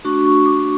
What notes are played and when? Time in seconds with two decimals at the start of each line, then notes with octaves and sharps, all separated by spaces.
0.05 A3 D4 F#4 C#6
0.25 C#6
0.46 D6